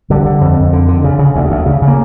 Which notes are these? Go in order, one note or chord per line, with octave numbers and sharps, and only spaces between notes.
D3 G3
D3
F2
F2
D3
D3
C#3
C#3
D2
D2
C#3
C#3
A#3